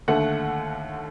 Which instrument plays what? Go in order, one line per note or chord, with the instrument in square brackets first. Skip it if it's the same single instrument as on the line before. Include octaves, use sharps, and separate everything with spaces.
[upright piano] D#2 D3 A3 F#5